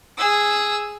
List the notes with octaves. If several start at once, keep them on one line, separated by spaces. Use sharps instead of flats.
G#4 E6